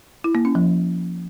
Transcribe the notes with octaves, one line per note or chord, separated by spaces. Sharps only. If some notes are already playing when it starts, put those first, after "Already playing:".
E4
A#3
C#4
F3